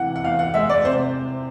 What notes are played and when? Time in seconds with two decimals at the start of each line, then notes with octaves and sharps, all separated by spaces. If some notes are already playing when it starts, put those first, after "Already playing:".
Already playing: C3 E3 F#5
0.16 F#5
0.24 E2 F5
0.39 F#5
0.54 G#3 E5
0.70 D5
0.84 C3 C5